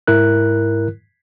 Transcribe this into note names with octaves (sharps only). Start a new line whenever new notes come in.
G#2 E4 A#4 F#6